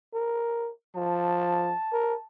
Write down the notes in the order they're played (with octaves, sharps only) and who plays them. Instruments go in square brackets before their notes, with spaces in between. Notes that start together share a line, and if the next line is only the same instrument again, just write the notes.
[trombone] A#4
[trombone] F3 [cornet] A5
[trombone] A#4